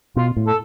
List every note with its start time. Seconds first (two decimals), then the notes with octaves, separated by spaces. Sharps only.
0.16 B2 F4
0.36 A2
0.47 A4